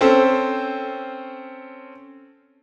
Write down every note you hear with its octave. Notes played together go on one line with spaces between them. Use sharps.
C4 C#4 A4 C5